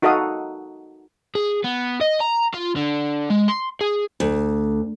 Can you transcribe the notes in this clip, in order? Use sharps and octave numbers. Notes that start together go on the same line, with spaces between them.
D#4 F#4 A4 D#5 F5 D#6
G#4
B3
D#5
A#5
F4
D3
G#3
C6
G#4
D2